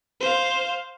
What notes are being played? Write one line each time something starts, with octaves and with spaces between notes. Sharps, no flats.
C5 F5